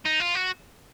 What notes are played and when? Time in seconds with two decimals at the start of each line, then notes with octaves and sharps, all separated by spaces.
0.05 D#4
0.20 F4
0.35 F#4